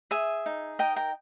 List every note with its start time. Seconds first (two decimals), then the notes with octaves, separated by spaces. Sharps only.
0.11 G#4 E5 G#5
0.46 D#4
0.79 A#4 D#5 G5
0.96 G5 A#5